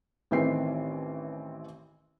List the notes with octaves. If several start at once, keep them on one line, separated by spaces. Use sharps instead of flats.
A1 D#3 E3 C4 G#4 C7